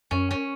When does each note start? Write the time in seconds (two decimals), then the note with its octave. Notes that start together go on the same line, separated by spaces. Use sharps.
0.11 F#2 C#4
0.31 C#4